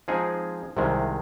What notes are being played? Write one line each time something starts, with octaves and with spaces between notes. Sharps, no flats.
F3 G#3 C4 D#4 G#4
C2 C3 D#3 G#3